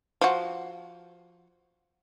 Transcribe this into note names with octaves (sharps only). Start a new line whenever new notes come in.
F3 F#4